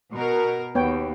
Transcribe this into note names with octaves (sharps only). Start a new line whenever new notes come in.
B2 A#4
D#2 B3 C#5 G5